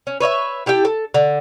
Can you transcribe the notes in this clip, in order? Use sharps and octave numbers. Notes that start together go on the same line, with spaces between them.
C#4
B4 C#5 D#5 E5
E4 G4 A4 G5
A4
D3